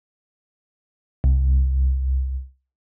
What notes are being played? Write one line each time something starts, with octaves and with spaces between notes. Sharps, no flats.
C2